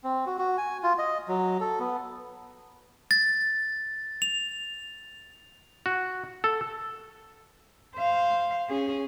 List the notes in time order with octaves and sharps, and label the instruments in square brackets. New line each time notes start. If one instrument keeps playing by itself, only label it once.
[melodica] C4
F#4
F#4
G#5
F4
D#5
F#3
A4
B3
[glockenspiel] A6
F7
[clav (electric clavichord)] F#4
A4
[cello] C5 F5
C#4 G#4